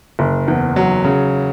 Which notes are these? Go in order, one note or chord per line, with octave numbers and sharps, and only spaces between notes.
F#1
E2
F#3
C#3